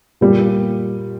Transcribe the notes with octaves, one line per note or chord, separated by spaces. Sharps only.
A#2 G3 A#3